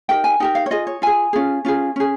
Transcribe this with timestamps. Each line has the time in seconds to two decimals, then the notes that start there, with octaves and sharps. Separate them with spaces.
0.09 D#4 G4 A#4 G5
0.24 G#5
0.40 D#4 G4 A#4 G5
0.55 F5
0.66 C#5
0.71 F4 G#4 D#5
0.87 C#5
1.02 F4 G#4 G#5
1.33 C#4 F4 G#4
1.65 C#4 F4 G#4
1.96 C#4 G#4